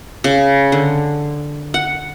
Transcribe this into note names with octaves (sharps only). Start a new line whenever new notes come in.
C#3
D3
F#5